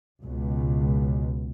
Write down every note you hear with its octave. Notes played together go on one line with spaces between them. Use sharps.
C#2 B2